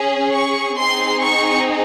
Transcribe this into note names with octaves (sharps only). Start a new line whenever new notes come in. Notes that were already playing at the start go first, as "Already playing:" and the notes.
Already playing: C#4 G#4
C#6
C4 D#4 G#4 C6
C#6